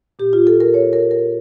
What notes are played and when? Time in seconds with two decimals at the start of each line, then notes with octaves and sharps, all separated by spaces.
0.19 A#2 G4
0.33 F4
0.47 A4
0.60 A#4
0.74 C#5
0.93 A#4
1.11 A#4